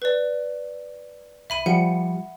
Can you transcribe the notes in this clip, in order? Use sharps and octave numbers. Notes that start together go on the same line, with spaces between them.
B4 D5
C2 E5 B5 D#7
F3 G3 F#5 C#7